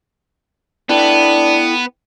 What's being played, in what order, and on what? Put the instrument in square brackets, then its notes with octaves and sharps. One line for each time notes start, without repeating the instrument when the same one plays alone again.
[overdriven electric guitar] B3 [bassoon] D4 [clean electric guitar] E4 A4 G5